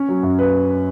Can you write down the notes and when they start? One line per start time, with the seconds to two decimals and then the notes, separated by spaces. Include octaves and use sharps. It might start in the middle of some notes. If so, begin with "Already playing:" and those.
Already playing: C#4
0.08 F#3
0.23 F#2
0.39 B4